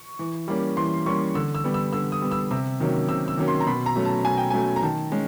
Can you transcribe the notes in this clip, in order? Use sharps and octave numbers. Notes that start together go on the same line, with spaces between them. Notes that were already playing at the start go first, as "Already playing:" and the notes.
Already playing: C#6
E3
G3 A#3 C#4
E3 C6
G3 A#3 C#4 C#6
D3 E6
E6
G3 B3
E6
D3 E6
D#6
G3 B3
E6
C3 E6
D#3 F#3 A#3 C#4
C3 E6
E6
D#3 F#3 A#3 C#4
C6
A#5
B2 B5
A#5
F#3 A3 C#4
A5
B2 G#5
G5
F#3 A3 C#4 G#5
A#5
D#3 A5
G#3 C#4